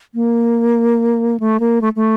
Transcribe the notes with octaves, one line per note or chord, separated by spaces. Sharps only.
A#3
A3
A#3
A3
A3